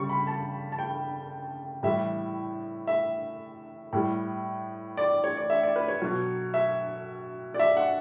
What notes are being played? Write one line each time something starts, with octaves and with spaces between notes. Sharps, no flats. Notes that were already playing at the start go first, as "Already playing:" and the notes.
Already playing: C#3 G3 C#6
B5
A5
A5
G5
A2 E3 G3 E5
E5
A2 G3
D5
C#5
D5
E5
D5
B4
C#5
B2 F#3
E5
D5
E5
F#5